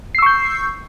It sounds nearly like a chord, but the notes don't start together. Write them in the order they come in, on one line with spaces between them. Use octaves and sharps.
C7 E6 C#6 G6